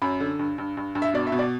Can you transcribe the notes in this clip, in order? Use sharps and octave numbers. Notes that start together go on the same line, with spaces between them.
F#2 B5
D3
G2
G2
G2
G2
E5
B2 D5
E5
B2
D5